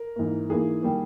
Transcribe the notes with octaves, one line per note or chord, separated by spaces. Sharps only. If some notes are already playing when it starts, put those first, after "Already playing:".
Already playing: A#4
G#2 E3 A#3
G#2 E3 A#3 G#4
D#3 G3 A#3